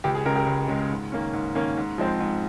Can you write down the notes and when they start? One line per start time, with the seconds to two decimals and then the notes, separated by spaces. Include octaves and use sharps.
0.04 C#2 G4
0.15 G#4
0.26 C#3 G#3 G4 A#4
0.36 G4 A#4
0.46 C#2
0.68 C#3 G#3
0.91 G#2
1.12 D#3 A#3 C#4
1.33 G#2
1.55 D#3 A#3 C#4
1.77 G#2
1.98 F3 G#3 C4
2.20 G#2